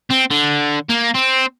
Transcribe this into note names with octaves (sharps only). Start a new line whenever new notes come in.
C4
D3
A#3
C4